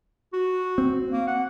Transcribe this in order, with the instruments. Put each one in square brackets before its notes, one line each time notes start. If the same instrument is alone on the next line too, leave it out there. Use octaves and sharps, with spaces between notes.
[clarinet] F#4
[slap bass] C4
[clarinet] A#3
F#5